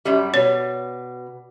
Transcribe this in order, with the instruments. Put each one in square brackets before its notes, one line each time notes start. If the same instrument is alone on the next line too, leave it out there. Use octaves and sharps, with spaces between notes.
[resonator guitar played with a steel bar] F#2 G3
[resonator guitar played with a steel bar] B2 [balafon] C#5